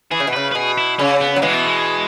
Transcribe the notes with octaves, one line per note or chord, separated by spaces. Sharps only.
E3 G#4
C#3
B2
C#3 B4
B4
B2 G#4
E4
C#3 C#4
B3
F#3
B2 E3 G#3
B3
G#3